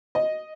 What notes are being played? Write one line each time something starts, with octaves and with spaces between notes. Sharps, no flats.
D#5